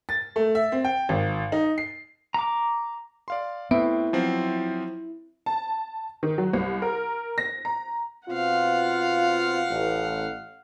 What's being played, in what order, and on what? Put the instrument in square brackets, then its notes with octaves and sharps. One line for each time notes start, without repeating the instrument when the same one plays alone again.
[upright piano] A6
A3
E5
C4
G5
G#1
D#4
C7
[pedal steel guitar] A#5 D6
[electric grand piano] D5 F5 C6
[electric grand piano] A2 C4 D7 [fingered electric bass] B3 [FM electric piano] E4
[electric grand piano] F3 F#3 C4
[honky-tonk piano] A5
D#3
F#3
C2
A#4
A#6
A#5
[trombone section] B2 C4 F4 [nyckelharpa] F5 F#5
[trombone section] A1